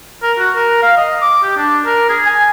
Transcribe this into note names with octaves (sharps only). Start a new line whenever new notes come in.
A#4
F#4
A#4
F5
D#5
D6
G4
D4
A#4
G#4
G#5